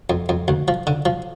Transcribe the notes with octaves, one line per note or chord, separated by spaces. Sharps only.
F2
F2
D2
F3
D3
F3